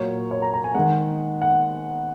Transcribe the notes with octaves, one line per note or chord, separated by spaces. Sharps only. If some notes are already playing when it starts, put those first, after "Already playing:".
Already playing: A#2 F#3 A#3 C#5
C#5
A#5
A#5
G#5
D#3 G#3 F#5
F#5